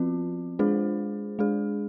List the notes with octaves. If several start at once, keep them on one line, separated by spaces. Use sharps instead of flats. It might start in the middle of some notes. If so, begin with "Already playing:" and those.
Already playing: F3 C4 F4
G#3 D4 F4 G#4 C5
G#3 D4 G#4